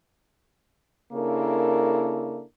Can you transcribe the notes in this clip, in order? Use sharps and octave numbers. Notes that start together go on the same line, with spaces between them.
C#3 A#3 D4 E4 A4 A#4